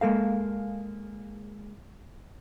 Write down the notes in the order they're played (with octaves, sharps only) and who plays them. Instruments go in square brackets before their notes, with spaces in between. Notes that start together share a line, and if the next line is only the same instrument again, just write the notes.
[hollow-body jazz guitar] G#3 A#3 A4 F5